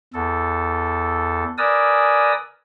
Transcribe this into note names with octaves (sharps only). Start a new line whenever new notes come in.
E2 A4
A#4 B4 D5 G#5 D#6 E6